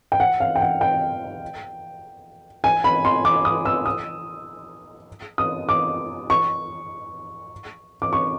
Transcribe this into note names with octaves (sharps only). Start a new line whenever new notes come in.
G5
F#5
F5
G5
F#5
G5
G#5
B5
C6
D6
D#6
E6
D#6
D#6
D6
C#6
D6
C#6